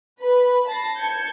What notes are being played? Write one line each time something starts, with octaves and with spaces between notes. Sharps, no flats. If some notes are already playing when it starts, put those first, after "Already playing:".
B4 B5
A5 B5 A6 A#6 C7
A5 G6 G#6 C#7